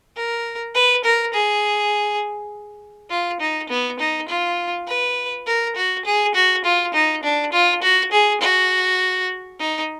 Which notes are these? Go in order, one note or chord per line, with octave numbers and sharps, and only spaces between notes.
A#4
B4
A#4
G#4
F4
D#4
B3
D#4
F4
B4
A#4
F#4
G#4
F#4
F4
D#4
D4
F4
F#4
G#4
F#4
D#4